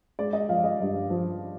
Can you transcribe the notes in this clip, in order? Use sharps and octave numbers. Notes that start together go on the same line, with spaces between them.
G#3 D5
D#5
F3 F5
D#5
G2
F3